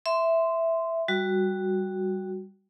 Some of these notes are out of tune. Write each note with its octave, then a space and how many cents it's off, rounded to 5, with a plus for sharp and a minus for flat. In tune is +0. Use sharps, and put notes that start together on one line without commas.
E5 +0 C6 -15
G3 +0 F#4 +0